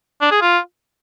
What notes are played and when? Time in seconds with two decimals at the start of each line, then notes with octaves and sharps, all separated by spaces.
0.21 D4
0.31 G#4
0.42 F4